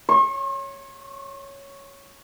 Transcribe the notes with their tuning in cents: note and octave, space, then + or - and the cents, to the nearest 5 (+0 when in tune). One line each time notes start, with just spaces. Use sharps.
C#5 +0 C6 +45